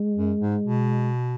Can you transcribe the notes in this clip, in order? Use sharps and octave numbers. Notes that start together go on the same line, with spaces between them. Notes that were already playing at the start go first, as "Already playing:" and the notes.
Already playing: G#3
F#2
G#2
B2